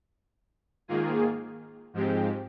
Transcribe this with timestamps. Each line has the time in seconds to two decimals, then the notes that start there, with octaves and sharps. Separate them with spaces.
0.88 G#2 D#3 A#3 F4 G#4
1.94 G#2 F3 G#3 C4 G4